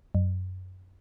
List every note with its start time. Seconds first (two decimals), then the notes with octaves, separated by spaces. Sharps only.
0.15 F#2